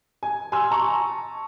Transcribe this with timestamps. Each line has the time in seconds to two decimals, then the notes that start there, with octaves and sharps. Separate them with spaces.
0.23 G#5
0.52 G#5 C6 E6
0.71 A5 A#5 C#6